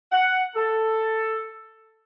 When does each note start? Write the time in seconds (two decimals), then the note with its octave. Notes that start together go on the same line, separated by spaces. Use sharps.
0.12 F#5
0.56 A4